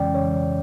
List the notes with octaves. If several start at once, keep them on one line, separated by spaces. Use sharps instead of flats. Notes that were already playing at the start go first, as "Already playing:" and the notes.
Already playing: F2 C#3 E3 G#3 C#4 D5 G5
C#5